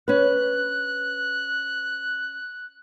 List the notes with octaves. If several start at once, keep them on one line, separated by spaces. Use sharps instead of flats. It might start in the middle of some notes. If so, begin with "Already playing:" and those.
C#4 B4 F#6